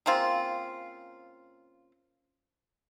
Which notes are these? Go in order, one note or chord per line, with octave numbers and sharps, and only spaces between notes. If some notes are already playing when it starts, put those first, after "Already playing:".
C#3 A#3 C4 F4